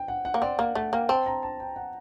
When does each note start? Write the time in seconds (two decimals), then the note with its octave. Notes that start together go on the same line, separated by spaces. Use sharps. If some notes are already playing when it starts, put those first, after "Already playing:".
Already playing: G5
0.08 F#5
0.25 F#5
0.34 A#3
0.42 C4 D5
0.58 A#3 F#5
0.75 A3 F#5
0.93 A#3 G5
1.09 C4 A5
1.26 A#5
1.43 A5
1.60 G5
1.76 F#5